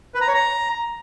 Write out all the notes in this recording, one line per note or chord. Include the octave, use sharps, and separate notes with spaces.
B4
A#5
C#5
A#5